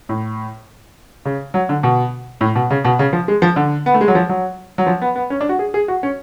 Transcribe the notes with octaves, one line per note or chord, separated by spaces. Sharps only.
A2
C#3
F#3
D3
B2
A2
B2
C#3
B2
C#3
F3
G#3
F3
D3
B3
A3
G#3
F#3
F3
F#3
F#3
F3
B3
B3
C#4
D4
F#4
G#4
G#4
F#4
C#4